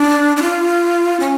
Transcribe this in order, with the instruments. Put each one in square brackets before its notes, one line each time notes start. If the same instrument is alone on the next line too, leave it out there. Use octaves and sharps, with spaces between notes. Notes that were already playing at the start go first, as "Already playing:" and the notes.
Already playing: [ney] D4
D4
F4
C#4